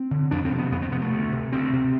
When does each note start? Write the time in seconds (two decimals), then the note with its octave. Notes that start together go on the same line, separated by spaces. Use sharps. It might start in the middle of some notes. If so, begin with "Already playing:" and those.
Already playing: C4
0.11 D3
0.31 F2 D4
0.45 C4
0.52 C3
0.58 B3
0.72 F2 B3
0.82 C4
0.92 C3 B3
1.02 A3
1.12 D2
1.32 C3
1.52 D2 C4
1.73 C3